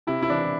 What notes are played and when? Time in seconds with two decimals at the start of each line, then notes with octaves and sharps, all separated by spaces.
0.07 C3 E4
0.22 E4
0.30 E3 D4